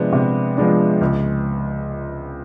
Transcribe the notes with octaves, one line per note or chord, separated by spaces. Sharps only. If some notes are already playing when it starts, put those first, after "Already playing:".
Already playing: C3 F3 G#3 B3 D4
C3
F3 G#3 B3 D4
C#2